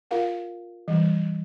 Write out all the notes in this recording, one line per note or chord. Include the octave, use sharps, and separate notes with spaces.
F4 A#4 F5 F#5
E3 G3